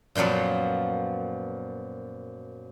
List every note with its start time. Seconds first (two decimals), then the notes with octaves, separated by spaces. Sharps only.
0.15 F#2 A#2 F3 F#3 B3